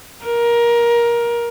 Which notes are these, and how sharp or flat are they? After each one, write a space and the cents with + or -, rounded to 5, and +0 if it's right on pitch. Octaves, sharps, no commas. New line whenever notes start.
A#4 +20